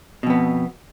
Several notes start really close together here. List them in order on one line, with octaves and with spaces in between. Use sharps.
B2 F2 B3